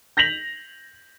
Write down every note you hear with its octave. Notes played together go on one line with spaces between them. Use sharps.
G6 A#6 B6 F7 F#7